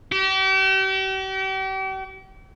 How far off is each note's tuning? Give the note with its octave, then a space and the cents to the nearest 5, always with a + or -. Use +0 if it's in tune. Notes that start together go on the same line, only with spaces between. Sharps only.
G4 -40